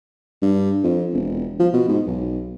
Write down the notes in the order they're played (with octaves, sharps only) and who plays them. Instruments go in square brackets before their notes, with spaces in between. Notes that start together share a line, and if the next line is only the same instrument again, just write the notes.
[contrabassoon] G2
F2
E1
F3
B2
G#2
B1